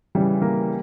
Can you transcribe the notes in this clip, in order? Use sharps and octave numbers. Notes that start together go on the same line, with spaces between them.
C#3 E3 G3
A#3